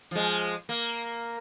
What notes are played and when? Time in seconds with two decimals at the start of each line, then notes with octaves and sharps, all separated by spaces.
0.11 F3 G#3
0.69 A#3